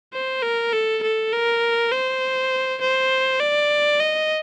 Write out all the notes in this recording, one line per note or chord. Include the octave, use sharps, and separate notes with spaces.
C5
A#4
A4
A4
A#4
C5
C5
D5
D#5